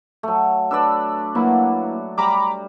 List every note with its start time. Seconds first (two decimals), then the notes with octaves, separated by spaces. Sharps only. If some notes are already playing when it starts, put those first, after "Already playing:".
0.23 F#3 A3
0.71 D4 B4 D5 E6
1.35 F#3 A#3 E4 B4
2.18 G3 A#5 B5 D6